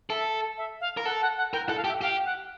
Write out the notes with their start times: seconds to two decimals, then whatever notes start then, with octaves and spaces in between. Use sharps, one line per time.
0.09 A4 E5
0.57 E5
0.81 F5
0.97 A#4
1.05 A4 F#5
1.22 F#5
1.37 F#5
1.53 A#4 G5
1.66 F#5
1.69 A4
1.77 F5
1.84 G4
1.88 E5
2.01 G4 F5
2.25 F#5